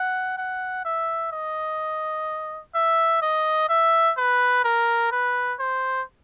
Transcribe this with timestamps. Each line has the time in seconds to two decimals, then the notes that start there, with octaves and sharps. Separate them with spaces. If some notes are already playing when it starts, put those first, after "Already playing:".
Already playing: F#5
0.37 F#5
0.84 E5
1.32 D#5
2.74 E5
3.22 D#5
3.69 E5
4.17 B4
4.64 A#4
5.11 B4
5.59 C5